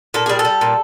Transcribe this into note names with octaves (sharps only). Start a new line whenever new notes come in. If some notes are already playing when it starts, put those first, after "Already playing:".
A#2 A4
G3 G#4
A4
G3
A#2